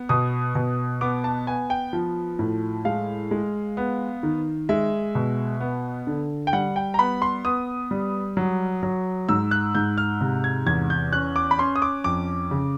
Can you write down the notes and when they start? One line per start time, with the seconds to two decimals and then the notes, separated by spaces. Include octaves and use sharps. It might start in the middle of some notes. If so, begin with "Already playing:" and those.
Already playing: B3
0.09 B2 D#6
0.55 B2
1.01 B3 D6
1.24 A5
1.47 B3 G#5
1.70 G5
1.93 F3
2.39 A2
2.85 G#3 F5
3.31 G#3
3.77 B3
4.23 D#3
4.69 G#3 E5
5.15 B2
5.60 B3
6.07 D3
6.47 G5
6.53 G3 F#5
6.76 G5
6.94 A#5
6.99 B3 B5
7.22 C6
7.45 B3 D#6
7.91 G3
8.37 F#3
8.83 F#3
9.29 G#2 E6
9.51 F#6
9.75 G#2 G6
9.98 F6
10.21 C3
10.44 G#6
10.66 E2 G#6
10.90 G6
11.12 C#4 F#6
11.36 D6
11.51 B5
11.58 C#4 C6
11.76 D#6
11.82 D6
12.04 F2 D6
12.51 C#3